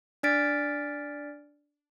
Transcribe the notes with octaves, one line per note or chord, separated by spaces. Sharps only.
D4 D5 F6 A6 B6 D7